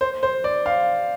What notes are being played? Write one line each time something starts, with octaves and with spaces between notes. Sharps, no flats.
C5
C5
D5
F5